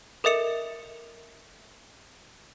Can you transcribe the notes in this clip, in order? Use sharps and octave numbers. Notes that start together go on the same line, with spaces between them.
A4 A#4 D#5 E5 C#7 F7